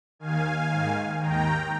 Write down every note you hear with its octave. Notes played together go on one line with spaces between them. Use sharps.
D#2 D#3 F5 G#5
G#2 D#3
D#2 D#3 G5 A#5